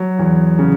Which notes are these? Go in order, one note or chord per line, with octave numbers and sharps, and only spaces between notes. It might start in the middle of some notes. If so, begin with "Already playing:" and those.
Already playing: F#3
E2
C#3